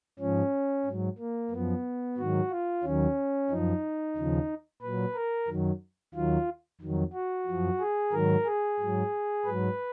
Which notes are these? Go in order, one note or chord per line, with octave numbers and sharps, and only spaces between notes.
G#2 F3 C#4
G#2 F#3
A#3
F#2 F3 B3
G#2 D#3 F#3 F#4
F4
D#2 D#3 F#3 C#4
F#2 F3 D#4
D#2 C#3 F3
A#2 F#3 B4
A#4
F#2 D#3 F#3
D#2 D#3 F#3 F4
F2 D#3 F#3
F#4
F#2 F3
G#4
G#2 D#3 F#3 A#4
G#4
G#2 F#3
G#2 F#3 B4